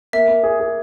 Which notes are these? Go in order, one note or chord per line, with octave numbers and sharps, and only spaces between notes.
A#3 E5
A#3
G#4
G#4